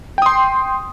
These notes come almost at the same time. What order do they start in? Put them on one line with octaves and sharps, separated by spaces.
G5 D#6 C6